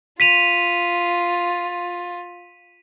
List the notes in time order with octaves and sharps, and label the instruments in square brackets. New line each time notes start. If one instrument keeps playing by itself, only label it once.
[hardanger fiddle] F4 [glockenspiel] B6 D#7 F7